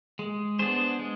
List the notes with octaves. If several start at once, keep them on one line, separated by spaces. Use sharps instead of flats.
G#3
B3 D4 G#4 C5
G#3